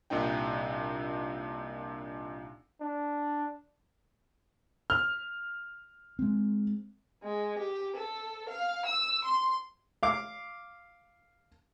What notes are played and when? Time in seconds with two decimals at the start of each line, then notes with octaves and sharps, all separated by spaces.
0.10 C2 A#2 D4 D#4 G5
2.81 D4
4.90 F6
6.19 G#3 C4
7.23 G#3
7.58 G4
7.96 A4
8.50 F5
8.85 E6
9.25 C6
10.03 F5 D6